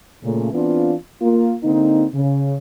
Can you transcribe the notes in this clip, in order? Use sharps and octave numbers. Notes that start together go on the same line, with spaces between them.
A#2 C#3 A3
E3 B3 C4 D4 F4
A#3 F4
D3 A#3 C4 D#4
C#3